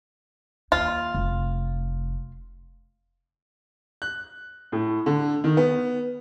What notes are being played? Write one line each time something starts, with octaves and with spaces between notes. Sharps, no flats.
D#2 F4
F1
F#6
A2
D3
D#3
B3